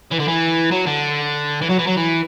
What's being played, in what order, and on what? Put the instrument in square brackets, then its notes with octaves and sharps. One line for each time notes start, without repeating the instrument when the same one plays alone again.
[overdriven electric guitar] E3
D3
E3
F#3
D3
E3
F#3
E3
F#3
E3